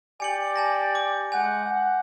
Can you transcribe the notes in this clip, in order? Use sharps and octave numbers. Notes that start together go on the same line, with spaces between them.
G4 D5 G5 G#5 C#7 F#7
G#5 A5 A#6
D6
G#3 F#5 G#5 G6
F#5